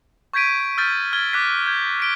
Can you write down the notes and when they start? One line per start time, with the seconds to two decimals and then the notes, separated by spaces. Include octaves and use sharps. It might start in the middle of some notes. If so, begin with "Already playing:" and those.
0.33 C#6 G6 G#6 B6 D7 D#7
0.78 E6 F6 G6 A6 B6
1.13 F6 G#6 G7
1.33 D6 F#6 B6
1.67 G6 G#6
2.00 B6 D7 G7